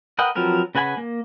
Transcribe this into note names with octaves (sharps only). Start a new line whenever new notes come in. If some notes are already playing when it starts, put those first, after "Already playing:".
A#4 B4 D#5 F#5 G5
F3 F#3 C4 A#4 B4
C#3 B4 F#5 G#5 B5
A#3